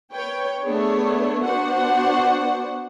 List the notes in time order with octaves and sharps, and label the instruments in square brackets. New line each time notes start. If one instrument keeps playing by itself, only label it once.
[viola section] B4 C#5 G5
A3 B3 D4 G#4 C#5
B3 D4 F#4 C5 F#5